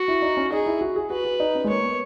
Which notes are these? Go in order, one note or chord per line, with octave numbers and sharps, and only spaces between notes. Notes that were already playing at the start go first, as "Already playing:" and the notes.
Already playing: F#4
E4
D#4
C#4
D#4 G#4
E4
F#4
G#4
F#4 B4
F#4
D#4
C#4
G#3
A#3 C#5
B3